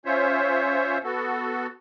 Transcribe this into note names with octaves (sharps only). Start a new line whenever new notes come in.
C#4 F4 C5 C#5 E5
B3 F#4 A4